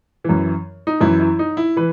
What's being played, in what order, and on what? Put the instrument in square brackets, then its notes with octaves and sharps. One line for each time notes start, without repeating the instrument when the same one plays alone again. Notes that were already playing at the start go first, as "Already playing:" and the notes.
[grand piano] F#2 E3
D#4
F#2 E3 E4
E4
D#4
E4
E3 B4